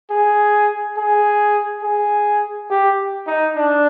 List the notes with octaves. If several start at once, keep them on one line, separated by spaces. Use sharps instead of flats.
G#4
G#4
G#4
G4
D#4
D4